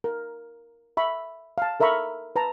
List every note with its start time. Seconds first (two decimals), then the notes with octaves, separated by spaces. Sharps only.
0.04 A#4
0.97 E5 B5 C#6
1.58 F5 A5
1.80 A4 A#4 E5 A#5 B5 C#6
2.36 B4 A5 A#5